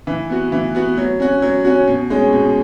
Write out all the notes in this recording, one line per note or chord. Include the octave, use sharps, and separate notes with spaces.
E3
B3 F#4
E3
B3 F#4
F#3
C#4 F#4
F#3
C#4 F#4
B2
G#3 C#4
B2